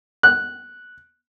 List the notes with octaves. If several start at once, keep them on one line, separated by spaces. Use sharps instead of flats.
F#6